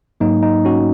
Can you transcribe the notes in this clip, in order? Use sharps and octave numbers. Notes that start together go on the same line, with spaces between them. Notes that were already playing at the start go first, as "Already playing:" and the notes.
G#2 F#3 A#3 D#4
D#4
C#4 F#4